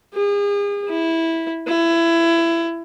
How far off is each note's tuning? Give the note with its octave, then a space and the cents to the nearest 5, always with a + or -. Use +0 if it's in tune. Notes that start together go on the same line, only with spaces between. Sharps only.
G#4 -40
E4 -10
E4 +20